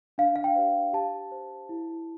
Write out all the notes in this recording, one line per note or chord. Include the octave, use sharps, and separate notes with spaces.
D4 F5
F5
G5
G4 C5
G4 A5
C5
E4